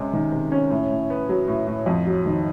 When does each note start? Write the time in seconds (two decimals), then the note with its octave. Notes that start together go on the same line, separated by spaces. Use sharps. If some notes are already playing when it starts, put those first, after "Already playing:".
Already playing: C3 G#3 C#4
0.13 D#3
0.32 C3
0.52 C#4
0.70 A2
0.91 A2
1.10 B3
1.29 F#3
1.48 A2
1.67 A2
1.86 F2
2.07 F#3
2.26 D#3